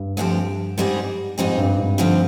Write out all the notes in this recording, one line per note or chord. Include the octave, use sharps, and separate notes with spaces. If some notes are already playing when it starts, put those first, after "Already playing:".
Already playing: G2
D2 D3 F3 C4 G4
G#2 G3 C4 D#4 G#4
F2 G#2 G3 C4 D#4 G#4
G2
G#2
D2 D3 F3 C4